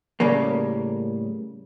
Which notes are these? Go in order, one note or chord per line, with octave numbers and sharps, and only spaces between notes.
A2 C#3 G3 A#3